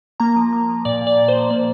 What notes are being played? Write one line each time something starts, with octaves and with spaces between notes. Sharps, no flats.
A#3 A#5
F3
A#3
F3
A#2 D5
A#2
D5
A#2
C5
F3
A#3 D5